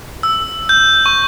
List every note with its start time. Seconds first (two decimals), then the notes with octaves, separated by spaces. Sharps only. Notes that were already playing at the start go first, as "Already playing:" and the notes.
0.23 E6
0.69 G6
1.06 C#6